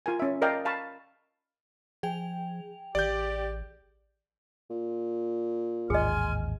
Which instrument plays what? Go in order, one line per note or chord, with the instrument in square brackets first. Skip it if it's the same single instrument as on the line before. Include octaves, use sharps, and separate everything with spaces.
[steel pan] F4 A#4 G#5
C#4 E5
A#4 D5 D#5 F5 G5 A5
F5 A5 B5 C#6
[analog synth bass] F3 [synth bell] G#4 G5 F7
[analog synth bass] A1 [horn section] G4 [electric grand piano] D5 G6
[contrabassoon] A#2
[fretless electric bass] A1 D#2 G#2 [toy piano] G#4 D#5 [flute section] G#5 C6 F6